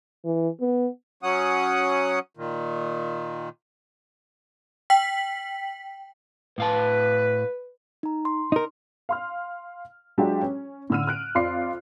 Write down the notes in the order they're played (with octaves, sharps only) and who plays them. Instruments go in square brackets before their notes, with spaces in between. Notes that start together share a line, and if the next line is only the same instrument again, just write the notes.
[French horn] E3
B3
[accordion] F#3 C#4 F#5 D#6
A#2 D#3
[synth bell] G5 B6 F#7
[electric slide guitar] A2 F5 A5 [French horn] B4
[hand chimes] D#4 A#5
C6
[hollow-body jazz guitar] D#4 A#4
[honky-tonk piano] F5 C6 F6
F#3 G#3 D4 F4 G4
C#4
A2 D3 E6 F6 D#7
F6 F#6 D7
F2 F4 D5 C6 C7